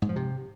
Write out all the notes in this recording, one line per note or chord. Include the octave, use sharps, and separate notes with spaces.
G#2
F3
C3